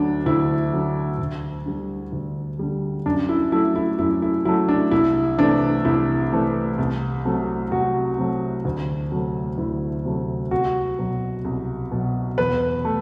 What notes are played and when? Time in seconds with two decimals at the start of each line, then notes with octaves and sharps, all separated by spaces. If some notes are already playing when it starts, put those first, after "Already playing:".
Already playing: D2 D3 F#3 A3 D4
0.26 D2 E4
0.73 D3 F#3 A3
1.19 D2
1.66 D3 G3
2.12 D2
2.59 D3 G3
3.06 F#2 D4
3.29 E4
3.52 F#3 A3 E4
3.76 E4
3.99 F#2 E4
4.22 E4
4.45 F#3 E4
4.48 A3
4.68 D4
4.91 C2 E4
5.38 C3 E3 A3 D4
5.85 C2 E4
6.32 C3 E3 A3
6.79 C2
7.25 C3 F#3 A3
7.71 C2 F#4
8.18 C3 F#3 A3
8.65 D2
9.12 C3 F#3 A3
9.58 D2 E4
10.05 C3 F#3 A3
10.51 C2 F#4
10.98 B2 F#3
11.45 C2
11.92 B2 F#3
12.38 E2 B4
12.85 A3